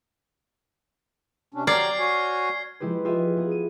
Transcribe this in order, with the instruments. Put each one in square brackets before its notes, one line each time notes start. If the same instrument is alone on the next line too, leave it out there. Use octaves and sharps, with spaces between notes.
[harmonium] C3 C#4 D4
[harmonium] F#3 G4 A#5 [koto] D5 [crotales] F6 G#6 C7
[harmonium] F#4 C#5 G#5
[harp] F3 G#3 E4 G4 B4
F4 G4 G#4 E5
B3 G#4
D#7